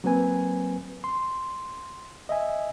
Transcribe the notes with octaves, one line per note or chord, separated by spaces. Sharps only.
F#3 A#3 C4 B4 G#5
C6
D#5 E5 G#5